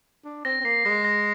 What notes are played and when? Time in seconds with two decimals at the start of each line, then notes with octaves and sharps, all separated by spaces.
0.25 D4
0.45 C4 A#6
0.61 C4
0.64 A#3 C7
0.85 G#3 A#6
1.05 A#6